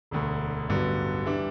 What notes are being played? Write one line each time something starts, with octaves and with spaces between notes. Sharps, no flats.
E1 D2 D3
A1 G2 D3 F#3 B3
E3 G3 D4